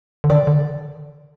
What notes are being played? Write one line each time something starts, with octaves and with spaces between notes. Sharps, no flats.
D3
D#3 D5
D3